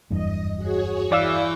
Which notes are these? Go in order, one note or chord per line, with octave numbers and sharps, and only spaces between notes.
F#1 E2 G2 D#5
F#4 G#4 C#5
E3 D5 F5 C#6 E6 G6